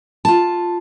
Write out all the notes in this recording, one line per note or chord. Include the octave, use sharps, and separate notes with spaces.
F4 A5